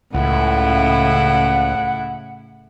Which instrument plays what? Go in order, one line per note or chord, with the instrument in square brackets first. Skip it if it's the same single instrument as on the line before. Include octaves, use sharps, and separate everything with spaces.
[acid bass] C#2 [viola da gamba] A2 C#3 E4 [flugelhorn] F#5